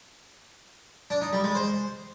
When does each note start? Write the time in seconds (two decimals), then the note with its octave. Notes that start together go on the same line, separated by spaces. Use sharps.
1.10 D4
1.22 D#4
1.33 G3
1.44 G#3
1.55 C5